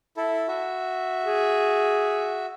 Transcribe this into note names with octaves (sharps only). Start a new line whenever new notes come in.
E4 A4
F#4 E5
G#4